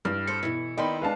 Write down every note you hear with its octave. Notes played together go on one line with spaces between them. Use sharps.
G2 E3 F6
A4 C5 C#7
B2 E3 E4
D#3 B3 E4 D5 D#5 G5 B5 C6
G#3 D4 B4 F5 A5